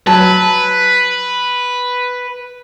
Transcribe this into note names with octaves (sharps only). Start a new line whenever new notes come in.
F#3 B4 A5